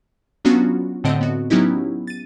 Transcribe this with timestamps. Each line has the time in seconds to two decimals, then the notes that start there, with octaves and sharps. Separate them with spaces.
0.45 F#3 B3 C#4 D4 F4 F#4
1.04 A2 D3 C4 D#5 D7
1.21 B3 F#4
1.50 F#3 B3 C#4 D#4 E4 G4
2.07 A6 D#7